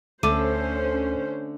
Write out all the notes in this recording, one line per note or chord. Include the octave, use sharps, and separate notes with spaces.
D2 D3 A3 C#4 A4 C5 D6 D#7